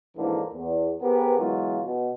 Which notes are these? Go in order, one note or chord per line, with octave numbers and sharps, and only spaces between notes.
D2 G#2 D3 E3 F3 A#3
E2
B3 C4 G4 G#4 A#4 B4
B2 E3 F#3 G#3 F4
B2